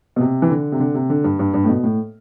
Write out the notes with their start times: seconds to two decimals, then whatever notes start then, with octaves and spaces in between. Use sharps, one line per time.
0.16 B2
0.20 C3
0.42 E3
0.50 D3
0.72 C3
0.80 D3
0.94 C3
1.10 D3
1.24 G2
1.39 G2
1.54 G2
1.64 A2
1.69 B2
1.84 A2